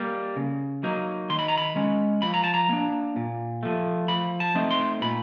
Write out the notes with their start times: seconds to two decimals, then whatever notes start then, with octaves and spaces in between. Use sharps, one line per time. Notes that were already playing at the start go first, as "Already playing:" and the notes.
Already playing: G3 A#3
0.36 C#3
0.83 F#3 A#3 D#4
1.30 D#3 C6
1.39 B5
1.48 A#5
1.58 B5
1.76 G#3 C#4
2.22 F3 B5
2.34 A#5
2.44 A5
2.54 A#5
2.69 A#3 D4
3.16 A#2
3.63 F3 A3
4.08 F3 B5
4.40 A5
4.55 A3 C4 D#4
4.71 C6
5.01 A#2 B5